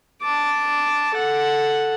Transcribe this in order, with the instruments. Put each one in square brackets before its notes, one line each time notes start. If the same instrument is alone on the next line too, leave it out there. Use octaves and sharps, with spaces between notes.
[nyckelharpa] A5 D6
A4 F#5